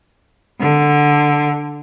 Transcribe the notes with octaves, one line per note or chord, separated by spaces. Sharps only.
D3